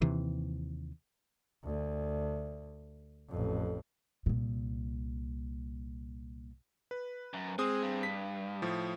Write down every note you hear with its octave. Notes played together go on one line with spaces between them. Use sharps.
D#2 C3 E3
D2
A1 F2
C2 A#2
B4
F#2
G#3 C4 G#4 D#6
G2
B6
A2 F3